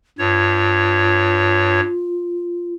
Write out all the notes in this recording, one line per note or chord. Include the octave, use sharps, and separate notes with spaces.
G2 F4 C#5